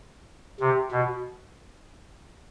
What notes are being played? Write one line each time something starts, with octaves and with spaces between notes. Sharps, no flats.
C3
B2